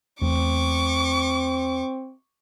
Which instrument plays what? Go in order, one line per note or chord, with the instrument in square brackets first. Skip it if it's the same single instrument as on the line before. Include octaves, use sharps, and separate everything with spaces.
[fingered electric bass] E2 A3 [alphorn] C4 [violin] C#6 D6